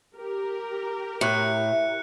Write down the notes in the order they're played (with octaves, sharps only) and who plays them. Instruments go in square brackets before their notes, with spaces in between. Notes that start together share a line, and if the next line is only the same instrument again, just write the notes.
[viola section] G4 A#4
[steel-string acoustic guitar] A2 [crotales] F#6 C#7